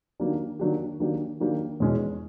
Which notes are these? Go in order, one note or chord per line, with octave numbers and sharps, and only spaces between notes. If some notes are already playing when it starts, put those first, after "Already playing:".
D#3 F#3 A#3 D4 G4
D#3 F#3 A#3 D4 G4
D#3 F#3 A#3 D4 G4
D#3 F#3 A#3 D4 G4
E2 B2 G#3 C#4